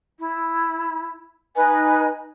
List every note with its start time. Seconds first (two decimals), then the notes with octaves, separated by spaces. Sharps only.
0.19 E4
1.55 D#4 B4 D#5 G#5